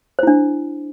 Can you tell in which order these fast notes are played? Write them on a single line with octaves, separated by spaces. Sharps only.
C5 E4 D4